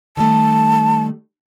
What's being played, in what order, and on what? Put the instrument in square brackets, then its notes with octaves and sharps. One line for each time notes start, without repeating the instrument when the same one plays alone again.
[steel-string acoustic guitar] D#3 G3 A3 [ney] A5